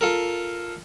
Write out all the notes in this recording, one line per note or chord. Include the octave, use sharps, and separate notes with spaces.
F4 A4 A#4